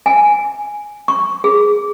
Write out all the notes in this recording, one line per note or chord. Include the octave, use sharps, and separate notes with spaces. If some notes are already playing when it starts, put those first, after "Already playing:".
G#5
C#6
G#4